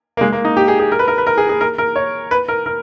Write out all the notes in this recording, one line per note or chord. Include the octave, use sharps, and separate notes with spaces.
A#3
G#3
A#3
D#4
G4
G#4
G#4
A#4
B4
A#4
B4
A#4
G#4
G#4
A#4
A#4
C#5
B4
A#4
A#4